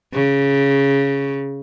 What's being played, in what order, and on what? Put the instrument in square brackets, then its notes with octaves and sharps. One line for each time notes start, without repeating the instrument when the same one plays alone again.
[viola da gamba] C#3